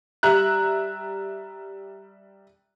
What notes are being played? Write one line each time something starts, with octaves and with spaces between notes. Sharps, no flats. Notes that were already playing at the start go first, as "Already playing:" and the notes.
G3 E5 A#5 F#6